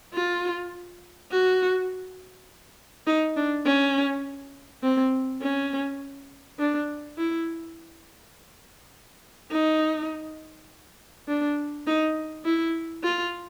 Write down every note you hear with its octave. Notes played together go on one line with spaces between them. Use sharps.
F4
F#4
D#4
D4
C#4
C4
C#4
D4
E4
D#4
D4
D#4
E4
F4